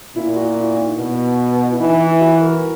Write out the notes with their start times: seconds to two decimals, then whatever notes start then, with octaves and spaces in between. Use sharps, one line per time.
0.15 A#2 E4
0.36 F#4
0.56 E4
0.76 D#4
0.98 B2
1.72 E4
1.80 E3 D#4
2.00 E4
2.21 F#4
2.41 A#4